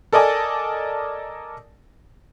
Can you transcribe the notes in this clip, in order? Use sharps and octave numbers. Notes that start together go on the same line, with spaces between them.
A4 A#4 D5 D#5 G#5 A5